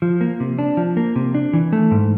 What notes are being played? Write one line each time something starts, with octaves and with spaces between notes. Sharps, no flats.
F3
A#3
C3
D4
F3
A#3
C3
D4
E3
A3
G#2